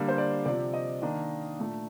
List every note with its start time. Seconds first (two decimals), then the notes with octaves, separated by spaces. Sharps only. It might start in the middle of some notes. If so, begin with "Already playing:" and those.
Already playing: D3 G3 A#3 D4
0.08 C5
0.18 D5
0.46 C3 F3 C4 D5
0.74 D#5
1.02 D#3 A#3 D4
1.58 A#2 A3 D4